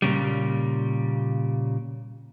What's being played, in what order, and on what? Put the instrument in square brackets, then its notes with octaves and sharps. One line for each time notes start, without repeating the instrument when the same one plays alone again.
[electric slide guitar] A#2 C#3 G3